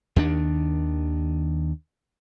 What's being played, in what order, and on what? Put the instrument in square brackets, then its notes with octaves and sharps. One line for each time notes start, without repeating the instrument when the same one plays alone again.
[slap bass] D#2 D#3 D4